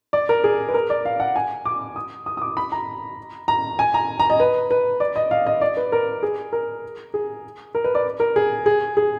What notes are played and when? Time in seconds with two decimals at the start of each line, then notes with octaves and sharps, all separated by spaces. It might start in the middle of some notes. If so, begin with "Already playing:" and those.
0.13 D5
0.29 A#4
0.44 G#4
0.69 B4
0.74 A#4
0.90 D5
1.05 F5
1.20 F#5
1.36 G#5
1.65 D6
1.96 D#6
2.26 D#6
2.37 D#6
2.42 D6
2.57 B5
2.72 A#5
3.48 A#5
3.79 G#5
3.94 A#5
4.20 A#5
4.30 D#5
4.40 B4
4.71 B4
5.00 D5
5.16 D#5
5.31 F5
5.46 D#5
5.61 D5
5.77 B4
5.92 A#4
6.23 G#4
6.53 A#4
7.14 G#4
7.75 A#4
7.84 B4
7.95 D5
8.20 A#4
8.36 G#4
8.66 G#4
8.97 G#4